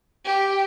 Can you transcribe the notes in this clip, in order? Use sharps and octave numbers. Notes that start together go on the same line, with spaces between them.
G4